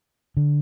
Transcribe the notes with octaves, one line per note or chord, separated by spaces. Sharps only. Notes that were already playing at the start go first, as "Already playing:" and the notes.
D3